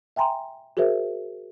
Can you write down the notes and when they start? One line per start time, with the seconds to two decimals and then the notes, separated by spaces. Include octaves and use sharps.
0.16 E5 G5 G#5 A#5 C6
0.77 F#4 G#4 A#4 C5 E5